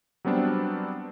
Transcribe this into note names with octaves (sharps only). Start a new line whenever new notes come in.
F#3 G3 B3 C4 D4